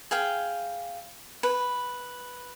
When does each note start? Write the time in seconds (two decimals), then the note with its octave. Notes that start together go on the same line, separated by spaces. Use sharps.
0.11 G#4 F5 G5
1.43 B4